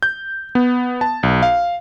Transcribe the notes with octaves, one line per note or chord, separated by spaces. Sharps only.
G6
B3
A5
B1
F5